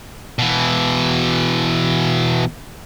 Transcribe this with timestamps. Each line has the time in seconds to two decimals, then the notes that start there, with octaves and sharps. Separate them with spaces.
0.39 B2 E3